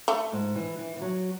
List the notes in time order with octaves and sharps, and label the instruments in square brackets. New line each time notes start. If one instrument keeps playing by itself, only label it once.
[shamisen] A3
[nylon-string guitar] G#2
E3
E3
E3
F#3